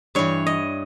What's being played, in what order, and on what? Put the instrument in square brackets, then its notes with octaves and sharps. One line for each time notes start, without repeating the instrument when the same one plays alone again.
[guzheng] G2 E3 C#5
D#5